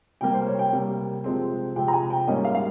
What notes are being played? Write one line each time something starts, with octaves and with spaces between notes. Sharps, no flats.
C3 G3 A#3 G5
C5
C#5
G5
C3 G3 A#3
C3 F3 G#3 C4
C3 F3 G#3 C4 G5
A#5
G#5
G5
G#2 G3 A#3 C#4 D#5
F5
F5